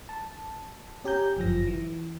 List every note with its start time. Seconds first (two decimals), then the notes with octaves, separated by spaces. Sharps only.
0.09 A5
1.04 C#4 G4 G#5 A#5 G6
1.36 G1 F#2 F3 A#6
1.67 E3